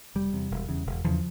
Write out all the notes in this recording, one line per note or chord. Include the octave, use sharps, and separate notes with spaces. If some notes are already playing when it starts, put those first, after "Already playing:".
F1 G3
E2 C3
E1
E2 C#3
E1
E2 C#3 F3